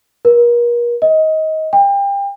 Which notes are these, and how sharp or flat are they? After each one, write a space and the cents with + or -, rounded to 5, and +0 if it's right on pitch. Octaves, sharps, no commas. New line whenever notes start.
A#4 +40
D#5 +20
G5 +30